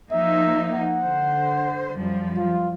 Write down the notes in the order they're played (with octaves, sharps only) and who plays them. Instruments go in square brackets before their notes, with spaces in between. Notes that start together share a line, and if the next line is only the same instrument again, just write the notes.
[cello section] F3 A#3 D#4 [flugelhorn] E5
[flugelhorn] F#5
[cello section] D3 C5
F#2 F3 G3
[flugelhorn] F4